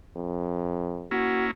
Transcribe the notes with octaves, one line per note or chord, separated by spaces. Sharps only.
F2
A#3 C#4 E4 F#4